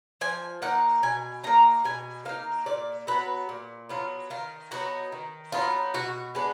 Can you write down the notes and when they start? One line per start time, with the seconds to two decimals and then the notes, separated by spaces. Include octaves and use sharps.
0.21 F3 G#5
0.62 A#3 D#4 F#5
1.03 B2 G#5
1.44 A#3 D#4 A#5
1.84 B2 G#5
2.25 A#3 D#4 F5
2.66 A#2 D5
3.07 F#3 B3 B4
3.49 A#2
3.89 F#3 B3 F4
4.30 D#3 F4
4.71 F#3 B3 D#4 F#4
5.12 D#3
5.52 F#3 B3 D#4 F4
5.94 B2 F#4
6.35 G#3 B3 D4